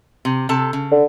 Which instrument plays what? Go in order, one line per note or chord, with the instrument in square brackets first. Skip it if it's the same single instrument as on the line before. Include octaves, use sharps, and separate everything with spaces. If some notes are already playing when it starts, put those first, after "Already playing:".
[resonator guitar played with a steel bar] C3
C3 A4 A5
C#3
[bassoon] D3